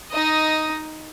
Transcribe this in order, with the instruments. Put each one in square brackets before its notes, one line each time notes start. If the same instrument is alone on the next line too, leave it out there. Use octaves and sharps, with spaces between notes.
[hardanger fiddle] D#4 D#5